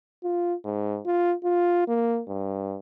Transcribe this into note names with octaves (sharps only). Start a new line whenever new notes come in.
F4
G#2
F4
F4
A#3
G2